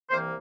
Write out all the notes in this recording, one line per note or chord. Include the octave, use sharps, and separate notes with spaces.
C2 C3 E3 A#3 C5